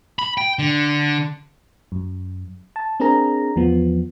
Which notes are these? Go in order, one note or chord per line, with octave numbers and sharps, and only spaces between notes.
B5
G5
D3
F#2
A5
C4 D4 G#4 A#4 A#5
E2 F3 B3